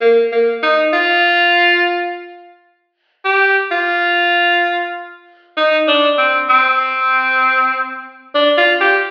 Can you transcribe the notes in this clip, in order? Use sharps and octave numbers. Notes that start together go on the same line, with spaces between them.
A#3
A#3
D#4
F4
G4
F4
D#4
D4
C4
C4
D4
F4
G4